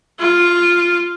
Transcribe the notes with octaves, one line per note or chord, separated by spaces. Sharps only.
F4